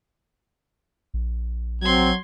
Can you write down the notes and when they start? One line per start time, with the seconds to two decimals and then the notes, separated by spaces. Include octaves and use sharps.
1.14 A#1
1.82 F#3 C4 C6 G#6